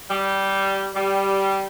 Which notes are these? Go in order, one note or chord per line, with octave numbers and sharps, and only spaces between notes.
G3
G3